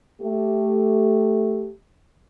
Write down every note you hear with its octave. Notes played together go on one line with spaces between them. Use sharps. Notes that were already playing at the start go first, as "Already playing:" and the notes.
A3 G4